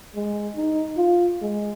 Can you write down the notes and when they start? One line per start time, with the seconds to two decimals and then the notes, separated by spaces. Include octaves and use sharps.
0.15 G#3
0.56 D#4
0.97 F4
1.41 G#3